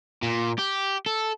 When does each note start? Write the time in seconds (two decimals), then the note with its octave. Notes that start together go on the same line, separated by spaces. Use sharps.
0.23 A#2
0.59 G4
1.06 A4